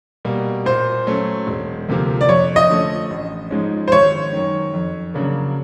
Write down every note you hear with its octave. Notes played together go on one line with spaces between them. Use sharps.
B2 G3 A#3
A#2 C5
F#3 A3 C#4
E1
D2 C3 F3 A#3
D5
F2 C#5
D#5
D3 F3 A3 C#4
A1
G#2 F3 G#3 C#4
C5
G#1 C#5
F#2 D#3
F2
C#3 F#3 A#3 D4